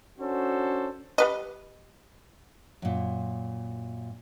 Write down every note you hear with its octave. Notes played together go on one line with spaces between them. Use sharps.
C#4 D4 F#4 A4 C5
G3 B4 D#5
F#2 A#2